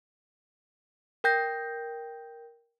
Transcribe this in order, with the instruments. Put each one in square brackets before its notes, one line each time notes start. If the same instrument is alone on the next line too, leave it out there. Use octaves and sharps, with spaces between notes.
[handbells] A#4 G5 G6 A#6